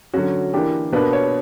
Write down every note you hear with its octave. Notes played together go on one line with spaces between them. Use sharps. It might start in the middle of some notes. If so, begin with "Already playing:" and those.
D3 F#3 C#4 F#4
E3 A#3 D4 G4
B2 A#3 D4 B4
C#5